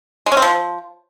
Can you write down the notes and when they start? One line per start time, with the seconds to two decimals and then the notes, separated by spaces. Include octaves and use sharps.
0.26 G#3
0.32 C#4
0.37 C4
0.42 F3